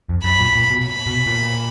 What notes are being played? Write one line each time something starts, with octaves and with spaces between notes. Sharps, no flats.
F2
F#2 B5
A#2
A#2
B2
B5
B2
A#2